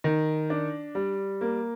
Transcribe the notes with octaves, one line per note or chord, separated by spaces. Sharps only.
D#3
D4
G3
A#3